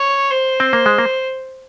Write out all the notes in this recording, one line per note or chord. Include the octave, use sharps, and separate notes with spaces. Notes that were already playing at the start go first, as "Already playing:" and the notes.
Already playing: C#5
C5
C4
A#3
G#3
A#3